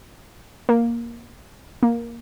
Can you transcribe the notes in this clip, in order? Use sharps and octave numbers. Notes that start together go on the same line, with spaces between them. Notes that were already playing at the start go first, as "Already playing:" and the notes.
A#3
A#3